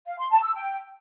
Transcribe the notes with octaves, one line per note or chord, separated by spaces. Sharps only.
F5
C6
A5
E6
G5